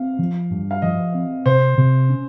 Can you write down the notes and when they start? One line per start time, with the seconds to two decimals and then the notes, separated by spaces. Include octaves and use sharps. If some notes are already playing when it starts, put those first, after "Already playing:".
Already playing: C4 F5
0.19 F3
0.51 G2
0.71 F5
0.82 F3 D#5
1.14 C4
1.46 C3 C5
1.78 C3
2.09 C#4